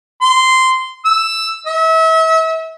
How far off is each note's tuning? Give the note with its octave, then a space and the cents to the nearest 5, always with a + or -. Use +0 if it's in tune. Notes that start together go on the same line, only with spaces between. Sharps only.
C6 -10
E6 +5
E5 -35